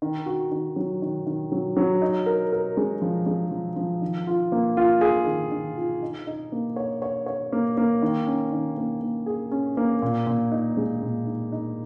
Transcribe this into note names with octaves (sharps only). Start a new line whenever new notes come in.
D#3
F#4
D#3
F#3
D#3
D#3
F#3
F#3
D#4
A#4
A#4
G#3
F3
G#3
F3
F3
D#3
F4
A#3
F4
G#4
D#3
D#3
F4
D#4
D#4
A#3
C#5
C#5
C#5
A#3
A#3
D#3
C#4
D#3
A#3
A#3
G#4
C#4
A#3
A#2
A#2
D#4
G#3
A#2
D#4
D#4